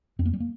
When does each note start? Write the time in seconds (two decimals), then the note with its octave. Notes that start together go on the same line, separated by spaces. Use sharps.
0.19 F2 C4
0.26 A#3
0.34 G3
0.40 A#3